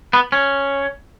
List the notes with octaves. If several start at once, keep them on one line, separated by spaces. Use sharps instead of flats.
B3
C#4